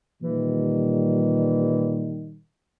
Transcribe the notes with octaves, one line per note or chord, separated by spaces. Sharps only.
A#2 D#3 E3 G3